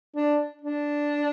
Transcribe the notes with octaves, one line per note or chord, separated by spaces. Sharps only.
D4
D4